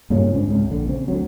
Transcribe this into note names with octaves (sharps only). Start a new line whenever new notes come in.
G2 A#2 C#3 C#4
G#2 C#3 C4 D4
C#2 G#2 C#3
A#1 D3
C#3 C4
D2 F#3